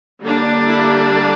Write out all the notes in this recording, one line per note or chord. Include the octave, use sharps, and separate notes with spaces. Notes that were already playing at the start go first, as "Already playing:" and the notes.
D3 G3 A#3 D4
E4